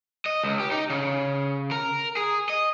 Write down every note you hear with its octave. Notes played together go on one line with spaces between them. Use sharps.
D#5
C#2
G4
D#4
C#3
A#4
G#4
D#5